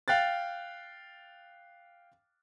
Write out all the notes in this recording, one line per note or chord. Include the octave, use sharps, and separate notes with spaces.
F5 G5 F#6 A6